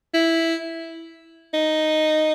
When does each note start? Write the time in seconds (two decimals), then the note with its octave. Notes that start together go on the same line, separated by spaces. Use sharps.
0.14 E4
1.54 D#4